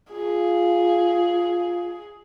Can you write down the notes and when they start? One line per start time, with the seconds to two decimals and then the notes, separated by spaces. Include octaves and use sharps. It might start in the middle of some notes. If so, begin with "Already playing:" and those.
0.12 F4 G#4